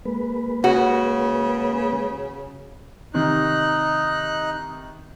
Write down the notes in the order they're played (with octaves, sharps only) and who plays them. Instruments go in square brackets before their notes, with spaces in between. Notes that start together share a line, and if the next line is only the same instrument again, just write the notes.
[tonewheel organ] G#3 A#3 B4
[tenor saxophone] C#3 [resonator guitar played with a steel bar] F#4
[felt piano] C3 D#3 [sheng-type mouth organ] D#4 F#6